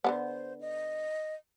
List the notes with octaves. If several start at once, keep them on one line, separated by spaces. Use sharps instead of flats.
D3 G#3 B3 C5
D#5